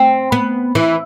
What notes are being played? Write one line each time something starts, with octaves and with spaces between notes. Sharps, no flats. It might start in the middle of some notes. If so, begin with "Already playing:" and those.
Already playing: C4
B3
E3